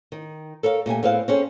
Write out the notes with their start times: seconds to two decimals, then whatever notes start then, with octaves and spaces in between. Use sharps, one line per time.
0.12 D#3
0.63 A4 A#4 C#5 F5
0.86 A#2 A3 G4 G#5
1.03 A2 B3 C4 G#4 F5
1.28 C4 C#4 G#4 A4